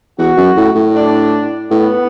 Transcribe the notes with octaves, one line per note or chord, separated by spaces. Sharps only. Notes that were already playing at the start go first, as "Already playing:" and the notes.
E2 F#4
F#2
A2
A2
D4
A2 B3